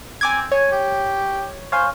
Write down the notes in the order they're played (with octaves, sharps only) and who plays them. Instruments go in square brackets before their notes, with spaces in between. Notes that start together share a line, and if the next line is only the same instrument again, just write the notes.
[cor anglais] C4 [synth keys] G#5 D6 G#6
[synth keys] C#5 [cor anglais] G#5
[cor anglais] G4
[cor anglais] C5 [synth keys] C#5 F5 G#5